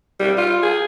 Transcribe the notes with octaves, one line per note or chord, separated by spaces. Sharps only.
G3
F4
G#4